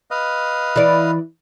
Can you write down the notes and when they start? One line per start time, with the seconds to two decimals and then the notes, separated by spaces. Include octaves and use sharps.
0.11 B4 D#5 F5
0.76 E3 D5